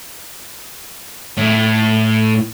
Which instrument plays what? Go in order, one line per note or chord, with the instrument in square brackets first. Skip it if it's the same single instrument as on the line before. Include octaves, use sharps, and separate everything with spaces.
[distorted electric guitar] A2